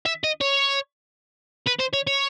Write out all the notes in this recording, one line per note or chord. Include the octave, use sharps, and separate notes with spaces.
E5
D#5
C#5
B4
C5
C#5
C#5